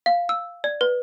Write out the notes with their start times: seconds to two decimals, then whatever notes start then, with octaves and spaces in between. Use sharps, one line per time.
0.06 F5
0.29 E6
0.64 D5
0.81 B4